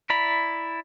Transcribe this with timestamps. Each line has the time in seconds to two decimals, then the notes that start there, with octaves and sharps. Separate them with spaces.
0.10 E4 D5 A#5 B5